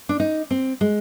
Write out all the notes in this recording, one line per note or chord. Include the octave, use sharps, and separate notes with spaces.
D4
D#4
C4
G#3